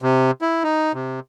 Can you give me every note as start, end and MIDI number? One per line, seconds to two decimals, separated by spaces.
0.02 0.31 48
0.42 0.63 64
0.63 0.92 63
0.94 1.20 48